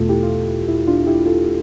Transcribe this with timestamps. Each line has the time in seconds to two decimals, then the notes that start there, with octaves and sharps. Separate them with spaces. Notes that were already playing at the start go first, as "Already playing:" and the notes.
Already playing: E2 B2 A3 F4 A4
0.09 E4 G4
0.23 F4
0.28 E4
0.48 E4
0.68 E4
0.87 D4 F4
1.07 E4 G4
1.26 F4 A4